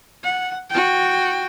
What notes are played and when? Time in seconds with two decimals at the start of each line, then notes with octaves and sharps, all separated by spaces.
0.23 F#5
0.69 F#4 G5